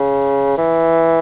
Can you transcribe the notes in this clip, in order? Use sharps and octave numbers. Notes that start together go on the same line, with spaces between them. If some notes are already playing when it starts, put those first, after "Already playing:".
Already playing: C#3
E3